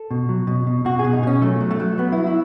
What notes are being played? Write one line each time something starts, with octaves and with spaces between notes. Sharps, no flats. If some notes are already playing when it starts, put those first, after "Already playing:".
Already playing: A4
B2
F#3
B2
B2
B2 F#4
B2 G#4
D#4
B2 C#4
F#3 A3
F#3
A3
F#3
F#3 B3
F#3 E4
E4